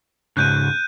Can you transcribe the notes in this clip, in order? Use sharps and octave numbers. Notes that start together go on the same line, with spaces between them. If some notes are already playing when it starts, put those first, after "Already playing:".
C#2 G#2 C#3 F#6 G6 D#7